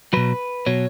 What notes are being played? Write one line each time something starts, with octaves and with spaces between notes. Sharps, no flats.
B2 F#3 B4
B2 F#3 C#5